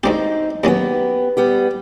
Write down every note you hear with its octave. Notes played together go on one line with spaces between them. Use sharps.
D2 G#3 C4 D#4 G4
D#2 F#3 B3 C#4 G4
G3 B3 G4